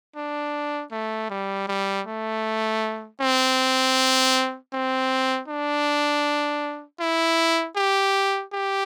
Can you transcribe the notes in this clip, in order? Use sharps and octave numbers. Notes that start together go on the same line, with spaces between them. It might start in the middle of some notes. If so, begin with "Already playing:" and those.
D4
A3
G3
G3
A3
C4
C4
D4
E4
G4
G4